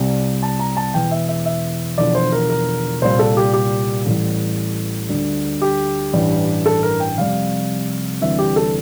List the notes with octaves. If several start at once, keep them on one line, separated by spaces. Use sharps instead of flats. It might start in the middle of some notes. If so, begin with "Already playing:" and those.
Already playing: C2 C3 G3
A5
A#5
A5
E1 E2 E3 G5
E5
E5
E5
E1 E2 D3 F3 D5
C5
A#4
A#4
C2 A#2 G3 C5
A4
G4
G4
A1 A2 E3 G3
D2 D3 G3
G4
A1 G2 E3 G3
A4
A#4
G5
F1 F2 C3 G3 F5
D2 C3 E3 G3 E5
G4
A4